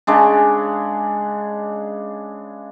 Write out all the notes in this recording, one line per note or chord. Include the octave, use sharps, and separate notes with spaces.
C#3 G#3 D4